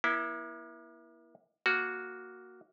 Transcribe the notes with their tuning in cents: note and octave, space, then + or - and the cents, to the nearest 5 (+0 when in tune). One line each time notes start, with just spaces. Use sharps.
A#3 +45 E4 +0
A#3 +0 F#4 -5